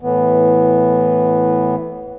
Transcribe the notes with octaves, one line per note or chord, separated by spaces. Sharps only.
A2 E3 B3